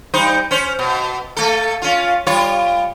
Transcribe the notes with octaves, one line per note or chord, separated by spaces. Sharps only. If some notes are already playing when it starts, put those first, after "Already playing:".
G3 D#4 C5
C#4 C5
B2
A3 A4
C#4 F4
G3 F4 C#5